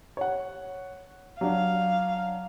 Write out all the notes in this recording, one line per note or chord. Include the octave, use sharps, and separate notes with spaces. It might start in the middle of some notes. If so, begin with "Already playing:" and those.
C#5 F#5
F#3 D4 F5